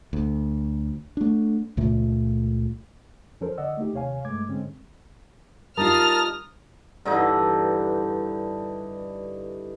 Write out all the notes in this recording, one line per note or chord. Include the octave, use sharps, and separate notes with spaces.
D2
A3 D4
C#2 A#2 A3
E2 F3 C#4 A4 A#4 C5
D3 D5 D#5 F#5 E6
A3 A#3 D#4 G4
D#2 C3 C#5 F5 G#5
G2 G#3 A3 D6 G#6
G#2 D3 G#3 C4 C#4
G3 D#4 F4 A#4 A5 D#6 F6
G2 D3 E3 D#4